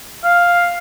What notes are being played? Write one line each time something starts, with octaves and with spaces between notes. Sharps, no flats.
F5